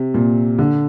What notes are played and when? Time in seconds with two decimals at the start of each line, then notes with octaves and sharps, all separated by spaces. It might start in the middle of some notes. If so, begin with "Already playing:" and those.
Already playing: C3
0.14 A#2
0.59 D3